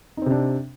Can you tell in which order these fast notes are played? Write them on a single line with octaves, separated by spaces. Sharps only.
D#4 C4 C3 D4